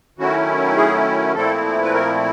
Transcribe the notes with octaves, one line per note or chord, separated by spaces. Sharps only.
D#3 F#3 A3 C#4 E4 F#4
G#4
A#2 F3 A3 C4 E4 A4
B4
A#4